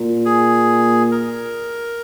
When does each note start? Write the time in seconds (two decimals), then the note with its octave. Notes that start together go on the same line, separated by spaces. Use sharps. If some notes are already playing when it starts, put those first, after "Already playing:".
Already playing: A#2
0.26 G#4
1.12 A#4